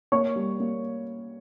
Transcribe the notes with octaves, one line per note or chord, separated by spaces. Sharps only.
A#3 C#5 C#6
G3
A#3